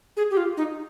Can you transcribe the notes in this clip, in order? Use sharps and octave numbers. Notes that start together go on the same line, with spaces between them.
G#4
G4
F4
D#4